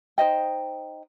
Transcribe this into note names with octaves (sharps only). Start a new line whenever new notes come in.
D#4 C5 D#5 G5